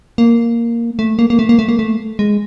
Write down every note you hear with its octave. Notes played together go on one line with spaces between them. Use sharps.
A#3
A3
A#3
A#3
A3
A#3
A3
A#3
A3
G#3